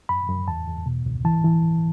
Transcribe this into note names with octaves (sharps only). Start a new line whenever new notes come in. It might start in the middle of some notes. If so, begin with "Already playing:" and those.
F#2 B5
F#2
E2 A5
E2
B2
C#2
E3 A5
E3